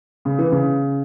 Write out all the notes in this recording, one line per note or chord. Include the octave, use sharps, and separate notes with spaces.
C#3
E3
C#3